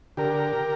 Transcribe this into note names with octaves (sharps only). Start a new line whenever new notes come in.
D3 G4 A#4